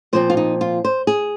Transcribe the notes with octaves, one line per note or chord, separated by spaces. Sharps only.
A#2 F3 C4 C5
F4
D#4
F4
C5
G#4